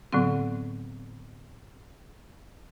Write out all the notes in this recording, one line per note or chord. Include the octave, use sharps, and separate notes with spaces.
A2 D3 F#3 B3 C4